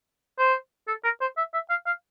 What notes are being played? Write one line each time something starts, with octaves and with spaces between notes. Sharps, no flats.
C5
A4
A#4
C5
E5
E5
F5
F5